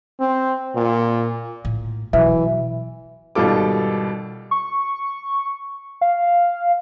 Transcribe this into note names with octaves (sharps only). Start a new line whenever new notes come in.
C4
A#2
A2
B2 E3 F#3 E5
G#1 B2 G3 F4 A4 D6
C#6
F5